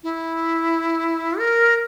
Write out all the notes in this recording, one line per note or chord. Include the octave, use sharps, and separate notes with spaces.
E4
A#4